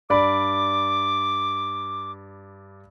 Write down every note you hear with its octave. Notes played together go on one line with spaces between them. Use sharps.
G2 D5 B5 D6